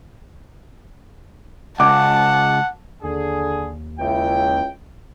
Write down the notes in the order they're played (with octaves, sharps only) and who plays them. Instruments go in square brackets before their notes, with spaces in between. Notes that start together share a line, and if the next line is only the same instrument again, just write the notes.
[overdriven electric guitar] C#2 [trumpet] F#5 [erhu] A5 [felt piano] D6
[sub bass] D#2 [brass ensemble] D3 G#4
[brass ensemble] C#2 E4 G5